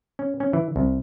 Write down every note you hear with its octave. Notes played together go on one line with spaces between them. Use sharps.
C#4
C#4
E3
C2